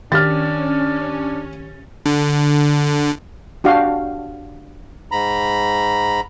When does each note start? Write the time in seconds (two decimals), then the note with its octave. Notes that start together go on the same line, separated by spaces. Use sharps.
0.12 D#3 C#4 D4 G4 F6 A6
2.06 D3
3.64 D4 F#4 G4 F5
5.12 G#2 A#5 B5